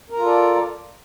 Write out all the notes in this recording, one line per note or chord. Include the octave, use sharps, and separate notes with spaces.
F4 A4 A#4 D5 A#5